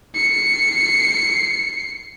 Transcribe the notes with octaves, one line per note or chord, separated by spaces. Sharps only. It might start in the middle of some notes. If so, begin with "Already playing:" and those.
C7 C#7